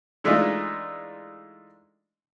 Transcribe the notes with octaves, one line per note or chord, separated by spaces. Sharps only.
E3 G#3 A3 D4 D#4 F4